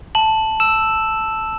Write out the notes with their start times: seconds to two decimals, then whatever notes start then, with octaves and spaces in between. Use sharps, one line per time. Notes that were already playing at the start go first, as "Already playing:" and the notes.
0.15 A5 F#7
0.60 E6 E7